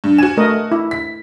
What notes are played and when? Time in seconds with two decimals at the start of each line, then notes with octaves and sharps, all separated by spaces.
0.04 G2
0.18 F#4 G#5 E7
0.37 A3 A#4 D#5
0.72 E4
0.91 B6